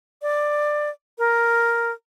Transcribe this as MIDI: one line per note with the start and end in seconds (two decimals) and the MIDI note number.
0.22 0.89 74
1.18 1.91 70